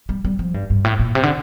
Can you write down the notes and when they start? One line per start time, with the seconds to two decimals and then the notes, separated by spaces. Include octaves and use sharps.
0.09 G3
0.25 G3
0.39 F3
0.54 G2
0.70 G2
0.84 A2
0.99 A#2
1.15 C3
1.23 D3